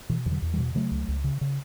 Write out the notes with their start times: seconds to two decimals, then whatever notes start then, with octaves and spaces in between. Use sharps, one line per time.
0.09 B2 E3
0.26 E2 E3
0.31 D3 F#3
0.42 E2
0.53 E3 G3
0.58 B2
0.75 C#3 F#3 A3
0.91 C#2
1.08 C#2
1.24 C#3
1.41 C#3